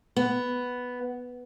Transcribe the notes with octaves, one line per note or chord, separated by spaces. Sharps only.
B3